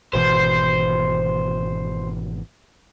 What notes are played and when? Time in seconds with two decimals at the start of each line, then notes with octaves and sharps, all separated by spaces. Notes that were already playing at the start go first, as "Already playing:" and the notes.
0.13 G#1 B2 E3 C5